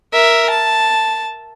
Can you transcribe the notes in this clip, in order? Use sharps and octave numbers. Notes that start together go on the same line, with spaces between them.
A#4 E5
A5